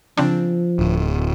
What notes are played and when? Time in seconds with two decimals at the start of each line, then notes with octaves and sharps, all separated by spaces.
0.18 C#3 F3 C4 D4
0.79 D1